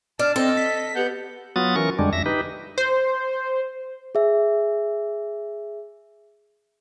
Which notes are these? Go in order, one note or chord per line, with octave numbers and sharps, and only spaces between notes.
D4 A5 F6
C4 A4 D#5
B6
B3 G4 F#5 G6
F#3 B3 F4 F#4 D#6 A6
E3 C#4 A#4 C#6
F2 D3 G3 G#3 D4
F2 E5 A#6
D#4 G4 B4
C5
G#4 E5